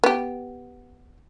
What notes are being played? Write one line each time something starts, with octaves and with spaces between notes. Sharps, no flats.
B3 G4